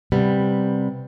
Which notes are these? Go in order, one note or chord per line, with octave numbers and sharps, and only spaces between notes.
C3 G3 B3